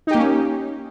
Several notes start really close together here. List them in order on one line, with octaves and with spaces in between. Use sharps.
D#4 G4 A#3 C#4